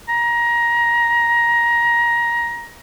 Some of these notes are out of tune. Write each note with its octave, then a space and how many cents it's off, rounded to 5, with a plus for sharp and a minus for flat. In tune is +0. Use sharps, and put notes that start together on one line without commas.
A#5 +20